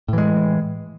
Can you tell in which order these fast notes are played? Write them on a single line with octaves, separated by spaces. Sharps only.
A2 E3 G#3